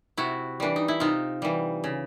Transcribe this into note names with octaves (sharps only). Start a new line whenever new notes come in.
C3 E4 F#4
E3 G3 D4
D#4
E4
C3 D#4 F4
E3 G3
C#3